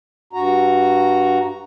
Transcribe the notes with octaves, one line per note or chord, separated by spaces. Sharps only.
G2 F#4 A#5